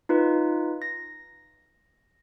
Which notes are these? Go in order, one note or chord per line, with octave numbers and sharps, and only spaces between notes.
D#4 F4 B4
A#6